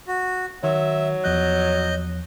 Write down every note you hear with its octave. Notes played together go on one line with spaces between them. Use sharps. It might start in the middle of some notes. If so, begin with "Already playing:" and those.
F#4
D#3 F#3 E5
E2 F3 D#5 F#6 G6